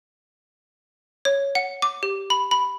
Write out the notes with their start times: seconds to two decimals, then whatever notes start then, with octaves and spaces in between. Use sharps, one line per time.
1.25 C#5
1.55 F#5
1.82 D6
2.03 G4
2.30 B5
2.51 B5